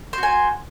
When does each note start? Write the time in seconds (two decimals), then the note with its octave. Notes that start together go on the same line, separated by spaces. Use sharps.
0.13 C5
0.18 F#4
0.23 G#5